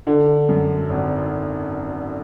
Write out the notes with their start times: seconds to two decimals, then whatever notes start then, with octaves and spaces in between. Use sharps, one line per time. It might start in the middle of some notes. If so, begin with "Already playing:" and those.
0.07 D3
0.49 F#2
0.90 G#1